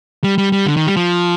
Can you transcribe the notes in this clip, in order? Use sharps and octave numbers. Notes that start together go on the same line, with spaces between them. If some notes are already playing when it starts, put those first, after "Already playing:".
G3
G3
G3
D3
D#3
G3
F3